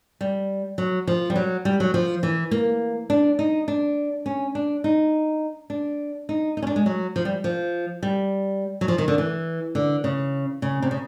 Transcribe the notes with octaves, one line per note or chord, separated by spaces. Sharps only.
G3
F#3
F3
G3
F#3
G3
F#3
F3
E3
A#3
D4
D#4
D4
C#4
D4
D#4
D4
D#4
D#4
C#4
D4
G#3
F#3
F3
G3
F3
G3
F#3
F3
D#3
D3
E3
D3
C#3
C#3
C3
C#3